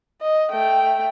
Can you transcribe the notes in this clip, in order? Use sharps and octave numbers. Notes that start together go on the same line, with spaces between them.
D#5
A3 G5